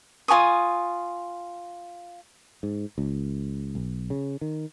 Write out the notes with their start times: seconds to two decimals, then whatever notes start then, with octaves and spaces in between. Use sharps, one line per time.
0.28 F4 G#5 C#6 D#6
2.63 G#2
2.98 C#2
3.75 B1
4.10 C#3
4.41 D#3